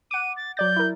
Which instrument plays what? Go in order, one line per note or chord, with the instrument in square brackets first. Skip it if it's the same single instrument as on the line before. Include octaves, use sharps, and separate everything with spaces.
[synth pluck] F#5 D6 [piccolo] D#7
[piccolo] A6
[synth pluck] F#3 D5 A6 [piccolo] G6
[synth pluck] E4 A#4